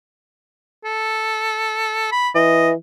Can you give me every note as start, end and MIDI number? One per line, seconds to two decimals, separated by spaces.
0.85 2.08 69
2.12 2.29 83
2.35 2.73 52
2.35 2.69 75